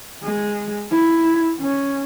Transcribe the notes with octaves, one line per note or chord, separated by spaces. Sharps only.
G#3
E4
C#4